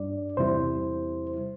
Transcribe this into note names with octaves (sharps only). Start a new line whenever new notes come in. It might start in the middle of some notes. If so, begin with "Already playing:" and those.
Already playing: G2 G3 D4 D5
E2 C3 G3 E4 C5